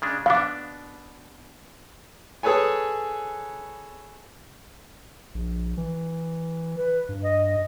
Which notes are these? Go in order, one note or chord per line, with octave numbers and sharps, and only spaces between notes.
C#3 G#3 D4
B2 B3 D4 F5 D6
G#4 A4 B4 C#5 G#5
A#1
E3
B4
G2
D#5